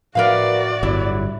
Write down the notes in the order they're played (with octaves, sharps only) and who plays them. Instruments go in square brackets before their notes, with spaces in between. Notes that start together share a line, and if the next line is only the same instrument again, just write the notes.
[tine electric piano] A2 F3 E5 [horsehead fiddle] F#4 D5 [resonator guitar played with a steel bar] A#4 B4 F5
[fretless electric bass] G1 [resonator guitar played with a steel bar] F#3 E4